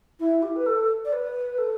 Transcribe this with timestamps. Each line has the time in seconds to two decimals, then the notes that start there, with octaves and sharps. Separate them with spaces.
0.20 E4
0.42 G4
0.56 B4
0.66 A4
1.05 D5
1.12 B4
1.58 A4